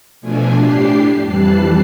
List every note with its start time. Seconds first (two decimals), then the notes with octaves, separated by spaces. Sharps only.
0.21 B2 F3 A3 D4 G#5
0.57 A2 D4 G4 C7
1.22 F2 E3 G3 A5 F#6 C7